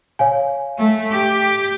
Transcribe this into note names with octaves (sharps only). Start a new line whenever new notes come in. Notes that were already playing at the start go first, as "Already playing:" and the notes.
C#5 F5 G#5
A3
G4